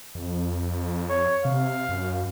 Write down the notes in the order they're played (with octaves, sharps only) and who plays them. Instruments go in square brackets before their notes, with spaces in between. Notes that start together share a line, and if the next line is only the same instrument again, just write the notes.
[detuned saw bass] F2
[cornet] C#5
[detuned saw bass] C3 [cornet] F5
[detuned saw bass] F#2